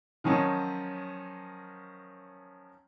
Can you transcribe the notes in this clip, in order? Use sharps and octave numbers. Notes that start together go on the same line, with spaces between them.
D#3 F3 F#3 C#4 D#4